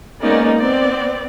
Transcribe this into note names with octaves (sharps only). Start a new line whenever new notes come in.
G#3 A#3 B3 C#4 D#4 D5
B3 C4 D5